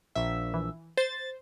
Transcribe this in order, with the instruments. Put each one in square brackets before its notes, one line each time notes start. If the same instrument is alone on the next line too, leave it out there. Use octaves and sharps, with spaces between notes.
[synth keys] A#1 E5
[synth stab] E3
[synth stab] C5 [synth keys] A6